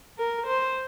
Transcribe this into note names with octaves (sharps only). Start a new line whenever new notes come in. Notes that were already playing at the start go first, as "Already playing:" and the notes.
A#4
C5